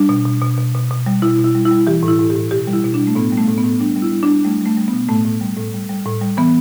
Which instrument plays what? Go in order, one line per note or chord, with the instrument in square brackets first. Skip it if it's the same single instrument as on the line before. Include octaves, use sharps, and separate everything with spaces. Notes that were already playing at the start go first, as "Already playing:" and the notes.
Already playing: [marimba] G3 D4
B2
B2
B2
B2
B2
B2
G3
B2 E4
B2
E4
G3
E4
G3
E3 G4
A2
E4
A2
G4
A2
B2 G4
G3
E4
B2
D4
G3
A3
A2 B3
G3
A3
A2
B3
A2
G3 D4
G3
E4
G3
D4
G3
G3 A3
G3 A3
G3
B3
B2
A2 A3
A2
G3
A2
G3
G3
A2
G3
E3 B3